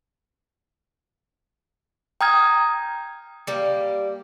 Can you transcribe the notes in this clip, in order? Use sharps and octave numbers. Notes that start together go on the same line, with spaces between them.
G5 A#5 D#6 F6 G#6
G3 A#3